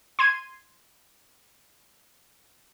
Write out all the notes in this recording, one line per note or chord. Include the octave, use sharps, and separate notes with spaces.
C6 G#6 D#7